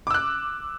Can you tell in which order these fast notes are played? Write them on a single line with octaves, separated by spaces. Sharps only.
D6 E6 F#6